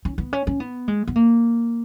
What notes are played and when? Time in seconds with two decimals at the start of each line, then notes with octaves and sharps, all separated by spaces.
0.05 C#4
0.18 B3
0.33 C#4
0.47 C#4
0.60 B3
0.88 G#3
1.08 B3
1.16 A#3